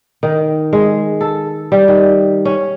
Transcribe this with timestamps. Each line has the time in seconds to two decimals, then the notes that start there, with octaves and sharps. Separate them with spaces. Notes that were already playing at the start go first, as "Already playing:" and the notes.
0.23 D#3
0.73 G#3
1.21 A4
1.72 G3
1.88 D#3
2.45 C#4